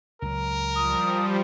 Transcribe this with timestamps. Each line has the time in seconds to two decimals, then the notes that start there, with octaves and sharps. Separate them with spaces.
0.22 C#2 F#3 A#4
0.76 F3 G3 D#6